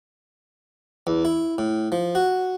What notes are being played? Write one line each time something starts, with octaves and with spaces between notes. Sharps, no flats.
E2
E4
A2
F3
F#4